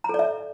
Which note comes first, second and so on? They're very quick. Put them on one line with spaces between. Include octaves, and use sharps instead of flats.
A#5 A4 D5 E5